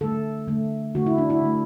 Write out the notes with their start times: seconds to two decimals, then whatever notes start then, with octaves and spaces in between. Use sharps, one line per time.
0.01 D3 A3 A4
0.47 D3 A3
0.95 D3 A3 F#4
1.07 E4
1.18 D4
1.30 E4
1.41 D3 A3